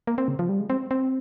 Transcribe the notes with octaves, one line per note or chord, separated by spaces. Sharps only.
A#3
C4
C#3
F3
G3
G#3
C4
C4